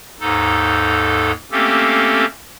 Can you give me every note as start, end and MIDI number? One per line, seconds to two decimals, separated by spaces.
0.20 1.32 39
0.20 1.32 44
0.20 1.32 63
0.20 1.32 69
1.51 2.25 57
1.51 2.25 58
1.51 2.25 60
1.51 2.25 61
1.51 2.25 67
1.51 2.25 69